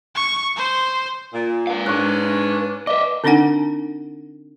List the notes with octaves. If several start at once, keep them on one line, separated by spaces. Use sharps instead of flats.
C#6
C5
A#2
B4 F5
G#2 C#4 D4 C#6 F#6
B4 D#5 E5 D6
D3 C4 D4 D#4 F#5 G#5